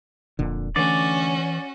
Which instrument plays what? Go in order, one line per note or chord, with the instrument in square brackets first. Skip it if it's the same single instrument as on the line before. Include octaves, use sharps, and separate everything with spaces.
[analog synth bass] D#1 [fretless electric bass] F2 A#2 D3
[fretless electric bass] D3 A3 [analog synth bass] E3 [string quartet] C#4 F#4 [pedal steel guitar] D5